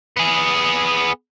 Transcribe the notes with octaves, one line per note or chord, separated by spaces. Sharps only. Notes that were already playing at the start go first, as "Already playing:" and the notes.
B3 G#4